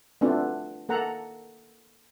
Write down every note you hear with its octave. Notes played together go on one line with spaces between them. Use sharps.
A3 B3 C4 D4 F4 F#4
A#3 A4 F#5 A#5